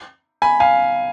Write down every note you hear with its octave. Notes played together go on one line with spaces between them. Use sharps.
G#5 B5
F5 G#5